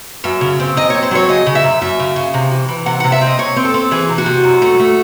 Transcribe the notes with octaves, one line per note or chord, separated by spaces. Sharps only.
F#2 E5
C#3
C4
F#2 D#5
C#5
C4
C5
F#3 C#5
C#3 D#5
C#3
E5
F#2
F#2 E5
C#3
C#3
C3
E3
E3
C3 F#5
C3 F#5
E5
C4 D#5
C4 C#5
C4
A4
C4
E3 G#4
C3
F#4
C3
F#2
A3
A3